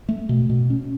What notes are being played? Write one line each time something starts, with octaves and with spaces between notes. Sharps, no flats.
A3
B2
B2
C#4